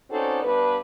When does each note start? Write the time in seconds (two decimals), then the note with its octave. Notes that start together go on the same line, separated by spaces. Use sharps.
0.10 C4 C#4 D#4 F#4 A4 D5
0.43 G2 B3 D4 B4